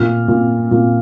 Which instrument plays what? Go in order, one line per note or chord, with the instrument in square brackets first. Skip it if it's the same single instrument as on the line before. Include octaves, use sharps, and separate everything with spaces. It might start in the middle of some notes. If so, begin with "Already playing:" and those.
Already playing: [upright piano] A#2 F6
A#2
A#2